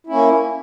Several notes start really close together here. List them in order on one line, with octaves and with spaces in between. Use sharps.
E4 C#4 A#3